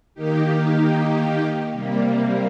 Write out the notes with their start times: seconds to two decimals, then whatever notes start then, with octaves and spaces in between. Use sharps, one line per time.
0.14 D#3 A#3 D#4 G4
1.72 C3 G3 A#3